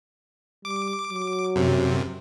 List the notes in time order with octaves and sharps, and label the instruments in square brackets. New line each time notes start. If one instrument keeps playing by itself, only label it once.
[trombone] G3 [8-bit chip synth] D6
[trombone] F#3
[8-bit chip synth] F#2 C3